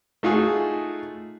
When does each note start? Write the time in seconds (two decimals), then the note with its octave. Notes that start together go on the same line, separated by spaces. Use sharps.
0.23 A3 D#4 F4 F#4 G#4